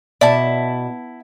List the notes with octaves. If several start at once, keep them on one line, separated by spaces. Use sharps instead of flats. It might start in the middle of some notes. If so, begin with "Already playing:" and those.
B2 E4 D5 A5